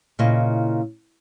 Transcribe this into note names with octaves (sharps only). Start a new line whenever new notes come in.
A#2 C#3 E4 D#5